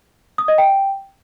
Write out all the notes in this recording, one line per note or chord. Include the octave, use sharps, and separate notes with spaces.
D#6
D#5
G5